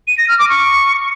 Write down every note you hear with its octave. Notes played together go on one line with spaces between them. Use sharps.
D#7
A#6
F6
D6
C#6